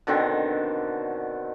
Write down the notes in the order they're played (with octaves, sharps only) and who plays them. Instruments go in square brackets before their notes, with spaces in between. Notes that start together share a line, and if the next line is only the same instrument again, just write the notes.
[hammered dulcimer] B2 D3 D#3 C4